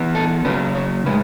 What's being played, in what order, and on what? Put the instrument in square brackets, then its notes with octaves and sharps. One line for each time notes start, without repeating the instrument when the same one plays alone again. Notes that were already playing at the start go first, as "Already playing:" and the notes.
Already playing: [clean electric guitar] E3 B3
A4
C#3 F#3 C#4 B4
C#5
A2 G#3 B4